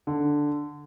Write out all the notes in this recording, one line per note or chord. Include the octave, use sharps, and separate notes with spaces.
D3